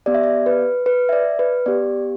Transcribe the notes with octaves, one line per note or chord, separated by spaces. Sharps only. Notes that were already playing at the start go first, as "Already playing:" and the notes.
B3 G4 D5
E5
D5
B4
B4
E5
D5
B4
B3 G4 D5